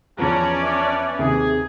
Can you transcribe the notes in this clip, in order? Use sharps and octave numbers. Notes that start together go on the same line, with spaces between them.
E2 F3 C#4 B4 C#5 D5 A5 A#5
D4 B4 E5 D6
D#2 C3 G#4